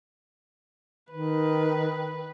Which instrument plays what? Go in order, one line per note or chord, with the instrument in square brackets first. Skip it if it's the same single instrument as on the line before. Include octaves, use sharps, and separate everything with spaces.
[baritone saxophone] D#3 [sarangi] B4